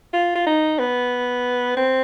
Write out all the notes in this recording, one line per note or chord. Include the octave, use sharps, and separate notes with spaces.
F4
F4
D#4
B3
C4